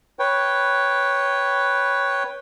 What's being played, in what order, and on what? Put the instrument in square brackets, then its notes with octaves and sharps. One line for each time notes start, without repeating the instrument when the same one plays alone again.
[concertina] B4 C#5 G5